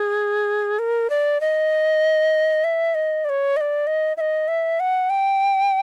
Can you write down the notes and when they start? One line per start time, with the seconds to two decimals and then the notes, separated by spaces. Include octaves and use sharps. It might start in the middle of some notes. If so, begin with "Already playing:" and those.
Already playing: G#4
0.79 A#4
1.10 D5
1.41 D#5
2.64 E5
2.95 D#5
3.25 D5
3.29 C#5
3.57 D#5
3.61 D5
3.87 D#5
4.17 E5
4.21 D#5
4.48 E5
4.80 F#5
5.10 G5